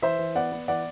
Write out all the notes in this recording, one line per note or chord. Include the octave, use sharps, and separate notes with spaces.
E3 C5 E5
E3
B3 D5 F#5
B3
E3 D5 F#5